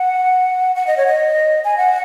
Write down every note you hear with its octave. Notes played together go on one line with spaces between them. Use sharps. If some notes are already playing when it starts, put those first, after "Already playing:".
Already playing: F#5
F#5
D#5
C#5
D#5
G#5
F#5